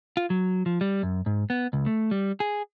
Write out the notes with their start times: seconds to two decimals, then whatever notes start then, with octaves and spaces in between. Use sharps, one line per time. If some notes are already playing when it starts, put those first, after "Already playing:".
0.17 F4
0.30 F#3
0.66 F3
0.81 G3
1.03 F#2
1.26 G#2
1.50 B3
1.73 C#2
1.86 A3
2.11 G3
2.40 G#4